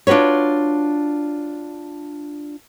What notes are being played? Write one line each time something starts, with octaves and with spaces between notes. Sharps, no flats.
D4 F4 F#4 B4 C#5